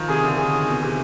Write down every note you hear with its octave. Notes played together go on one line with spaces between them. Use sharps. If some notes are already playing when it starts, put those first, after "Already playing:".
Already playing: D#3 F3
C3 G#4
D3
D#3 G#4
B2
C3